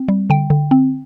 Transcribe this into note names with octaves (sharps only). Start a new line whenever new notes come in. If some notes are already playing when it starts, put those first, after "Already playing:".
Already playing: C4
G3
D3 G5
D3
C4